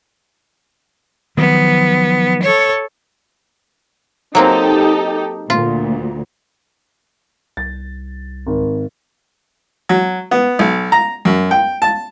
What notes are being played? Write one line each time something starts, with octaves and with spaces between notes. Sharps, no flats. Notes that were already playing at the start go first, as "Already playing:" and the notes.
D#3 F3 F#3 B3
A4 C#5
F#3 A#3 C4 D#4 G4 A4
D2 A#2 F4
C2 A6
G#1
F#3
B3
B1
A#5
F#2
G5
A5